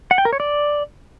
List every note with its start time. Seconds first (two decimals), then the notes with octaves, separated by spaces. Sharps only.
0.11 F#5
0.18 G5
0.25 A#4
0.33 C#5
0.40 D5